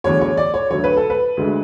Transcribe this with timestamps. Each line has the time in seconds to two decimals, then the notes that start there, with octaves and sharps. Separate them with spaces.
0.04 E2 D3 F#3 A3 C#5
0.21 C#5
0.37 D5
0.54 C#5
0.71 D2 D3 F#3 C#5
0.84 B4
0.97 A4
1.10 B4
1.37 D2 D3 G#3